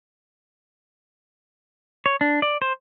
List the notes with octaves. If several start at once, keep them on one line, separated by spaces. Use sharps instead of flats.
C#5
D4
D5
C5